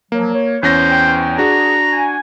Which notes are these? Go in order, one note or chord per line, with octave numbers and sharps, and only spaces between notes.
F3 F#3 A#3
C#5
E2 C#4 C5 A#6
G5
D4 F#4 G#4 A#5
G#5